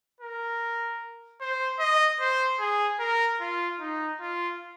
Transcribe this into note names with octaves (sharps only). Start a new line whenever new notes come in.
A#4
C5
D#5
C5
G#4
A#4
F4
D#4
F4